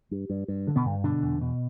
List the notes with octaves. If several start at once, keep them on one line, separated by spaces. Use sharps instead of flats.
G2
G2
G2
D3
B2 B3
G2
B2 D3 D4
E2
B2